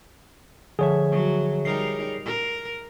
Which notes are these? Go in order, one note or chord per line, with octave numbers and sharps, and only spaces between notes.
D3 F3 G#4 C#5 E5
F#3
G3 D#4 A#4 C7 F7
A#4